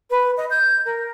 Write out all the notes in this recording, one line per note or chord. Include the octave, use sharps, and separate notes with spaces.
B4
D#5
G6
A#4